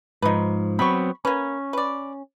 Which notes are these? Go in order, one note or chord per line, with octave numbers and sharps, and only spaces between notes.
G#2 F3 D#4 B4
F#3 B3 C4 B5 C#6
A#3 C#4 B4
B4 D5